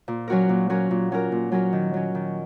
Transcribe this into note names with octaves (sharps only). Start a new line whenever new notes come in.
A#2
F#3 C#4 F#4 A#4
A#2
F#3 C#4 F#4 A#4
A#2
F#3 C#4 F#4 A#4
A#2
F#3 C#4 F#4 A#4
D#3
F#3 C#4
D#3